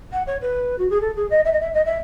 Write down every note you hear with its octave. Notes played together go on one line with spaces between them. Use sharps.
F#5
C#5
B4
F#4
G#4
A4
G#4
D#5
E5
D#5
E5
D#5
E5